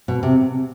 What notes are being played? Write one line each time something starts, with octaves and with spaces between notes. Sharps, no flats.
B2
C3